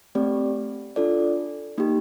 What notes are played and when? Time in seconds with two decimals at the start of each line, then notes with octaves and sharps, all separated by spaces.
0.15 A3 C4 G4 D5
0.96 D4 F4 A4 D5
1.78 A#3 D#4 G4